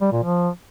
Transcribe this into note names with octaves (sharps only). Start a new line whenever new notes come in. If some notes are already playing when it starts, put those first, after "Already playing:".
G3
A#2
F3